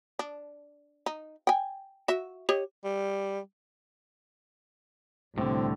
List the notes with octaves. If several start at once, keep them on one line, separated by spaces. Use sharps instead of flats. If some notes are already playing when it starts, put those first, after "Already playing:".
D4
D#4
G5 G#5
F#4 E5
G4 C#5 D#5
G3
C2 A2 D3 C4